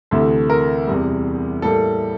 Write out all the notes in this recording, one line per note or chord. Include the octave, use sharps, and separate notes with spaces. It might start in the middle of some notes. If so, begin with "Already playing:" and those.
D2 C3 E3 A3
A#4
E2 C3 G3
A2 G3 A#3 A4